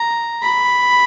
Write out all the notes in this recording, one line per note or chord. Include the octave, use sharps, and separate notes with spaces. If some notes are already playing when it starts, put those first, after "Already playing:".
Already playing: A#5
B5